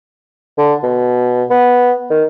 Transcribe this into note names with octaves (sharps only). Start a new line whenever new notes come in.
D3
B2
B3
D#3